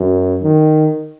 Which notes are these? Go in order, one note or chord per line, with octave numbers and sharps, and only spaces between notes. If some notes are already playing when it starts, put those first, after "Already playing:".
Already playing: F#2
D#3